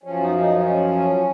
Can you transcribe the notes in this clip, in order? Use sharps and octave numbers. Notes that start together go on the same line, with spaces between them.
F#2 F3 C#4
D#4
D#4
C#4